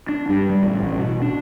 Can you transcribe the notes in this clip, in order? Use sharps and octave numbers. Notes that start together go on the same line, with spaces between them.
D4
G2
G3
A1
A1
B2
D4